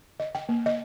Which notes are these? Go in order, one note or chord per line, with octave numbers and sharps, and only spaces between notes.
D#5
G5
A#3
D#5